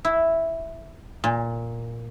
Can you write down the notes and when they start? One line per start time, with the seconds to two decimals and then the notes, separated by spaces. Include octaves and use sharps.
0.05 E4
1.24 A#2